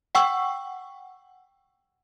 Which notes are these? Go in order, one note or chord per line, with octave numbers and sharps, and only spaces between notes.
F#5 G5 C#6 E6